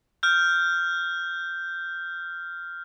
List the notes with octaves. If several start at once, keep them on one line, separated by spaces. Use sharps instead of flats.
F6 G6